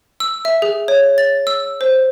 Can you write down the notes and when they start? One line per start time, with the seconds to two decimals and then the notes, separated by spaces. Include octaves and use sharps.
0.20 E6
0.45 E5
0.62 G#4
0.88 C#5
1.18 A6
1.47 E6
1.81 C5